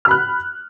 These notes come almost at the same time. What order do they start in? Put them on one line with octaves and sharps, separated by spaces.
F6 B5 F#6